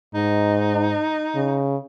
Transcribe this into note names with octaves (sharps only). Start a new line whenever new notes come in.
G#2 D#4
C#3